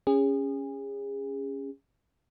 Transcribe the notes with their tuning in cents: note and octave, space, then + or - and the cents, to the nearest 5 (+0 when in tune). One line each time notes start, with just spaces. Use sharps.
C#4 +0 G#4 -30